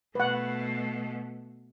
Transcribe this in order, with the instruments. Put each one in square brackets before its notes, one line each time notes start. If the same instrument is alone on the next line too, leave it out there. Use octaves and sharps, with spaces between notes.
[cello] B2 A3 [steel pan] B4 F#5